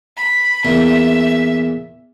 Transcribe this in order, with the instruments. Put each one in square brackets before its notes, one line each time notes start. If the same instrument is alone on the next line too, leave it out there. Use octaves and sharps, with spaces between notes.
[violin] B5
[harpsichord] E2 A#2 [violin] E5